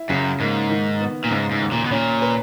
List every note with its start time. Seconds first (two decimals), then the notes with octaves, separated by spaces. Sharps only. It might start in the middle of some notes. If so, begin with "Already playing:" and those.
Already playing: E4
0.09 F#2 C#3
0.40 G#2 A#3
0.70 D#3
1.01 B3
1.24 A#2
1.31 G#2 C#3
1.51 G#2
1.61 D#2
1.72 A#2
1.85 B2
1.91 A#2 C#4
2.22 B4